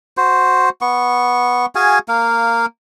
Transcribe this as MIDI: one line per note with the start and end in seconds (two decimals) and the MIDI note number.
0.17 0.69 66
0.17 0.69 72
0.81 1.66 59
0.81 1.66 85
1.75 1.99 66
1.75 1.99 68
1.75 1.99 77
1.75 1.99 80
2.08 2.66 58
2.08 2.66 77